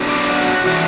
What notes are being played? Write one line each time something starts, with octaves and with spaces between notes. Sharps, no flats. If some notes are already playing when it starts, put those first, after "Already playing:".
Already playing: B2 F#3 D4
D5
F#4
E3 D4 F#4